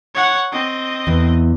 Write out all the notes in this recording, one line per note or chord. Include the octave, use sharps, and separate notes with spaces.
C#5 F#5
C4 D#5
E2